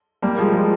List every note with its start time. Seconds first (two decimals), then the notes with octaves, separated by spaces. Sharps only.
0.22 G3 A#3
0.38 F3 G#3
0.54 F3 G#3